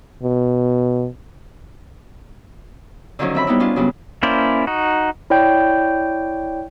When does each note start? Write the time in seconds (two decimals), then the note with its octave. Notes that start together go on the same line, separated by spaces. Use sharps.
0.23 B2
3.19 D3 D#3 F3 F#3 C#4
3.35 C4 E5 B5
3.47 G3 B3 D#4 E4
3.60 C#4 D4 F4
3.76 C#3 F#3 G3 B3
4.23 A#3 C#4 E4 C5 D5
4.67 D#4 F#4
5.30 E4 C#5 D5 G5 G6